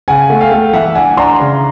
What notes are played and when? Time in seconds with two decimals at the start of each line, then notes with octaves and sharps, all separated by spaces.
0.08 C#3 F#5 G#5
0.30 A3
0.41 F5 G5
0.52 A3
0.73 E3 E5 F#5
0.95 D4 F#5 G#5
1.17 D4 A#5 C6
1.40 C#3